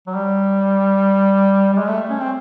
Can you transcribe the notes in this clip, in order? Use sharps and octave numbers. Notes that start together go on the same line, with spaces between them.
F#3
G3
G3
G#3
A3
C#4
C4